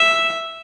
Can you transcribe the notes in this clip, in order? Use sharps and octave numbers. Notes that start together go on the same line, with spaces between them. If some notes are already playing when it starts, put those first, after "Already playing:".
Already playing: E5